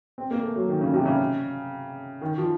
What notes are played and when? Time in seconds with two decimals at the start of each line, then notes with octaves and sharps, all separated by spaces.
0.18 C4
0.31 A#3
0.43 A3
0.56 F#3
0.69 D#3
0.81 C#3
0.94 C3
1.06 C#3
2.22 D#3
2.38 F3